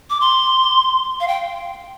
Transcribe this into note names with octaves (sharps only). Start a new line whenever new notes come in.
D6
C6
F5
G5